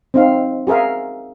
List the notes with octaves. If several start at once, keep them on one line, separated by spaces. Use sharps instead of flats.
C4 D#4 F5
F#4 G#4 A#4 E5 F5